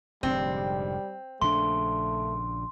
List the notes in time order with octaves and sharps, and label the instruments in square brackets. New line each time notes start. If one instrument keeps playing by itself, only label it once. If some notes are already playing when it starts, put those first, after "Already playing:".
[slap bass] F1 G#2 D3 [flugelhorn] G3 [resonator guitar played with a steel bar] C4
[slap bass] A#1 C#3 D4 [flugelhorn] A3 [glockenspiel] C6